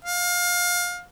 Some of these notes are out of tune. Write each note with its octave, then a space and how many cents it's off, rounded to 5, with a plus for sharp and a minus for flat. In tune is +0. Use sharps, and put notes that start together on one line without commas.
F5 +25